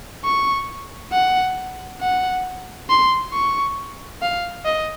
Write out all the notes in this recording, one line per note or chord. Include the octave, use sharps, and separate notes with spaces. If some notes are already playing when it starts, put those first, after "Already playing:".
C#6
F#5
F#5
C6
C#6
F5
D#5